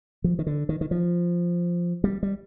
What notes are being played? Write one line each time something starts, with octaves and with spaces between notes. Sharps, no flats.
F3
D#3
D3
D#3
D#3
F3
G3
G3